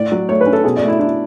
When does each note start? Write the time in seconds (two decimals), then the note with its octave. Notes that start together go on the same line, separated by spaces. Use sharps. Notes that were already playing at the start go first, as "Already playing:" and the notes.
Already playing: A2 D5
0.12 F#3
0.29 A3 C#5
0.41 B4
0.46 C#4
0.53 A4
0.64 B2 G#4
0.77 D5
0.82 A3
0.88 E4
0.99 D4 E4